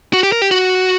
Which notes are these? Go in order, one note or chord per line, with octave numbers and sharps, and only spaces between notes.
F#4
G4
A#4
G4
F#4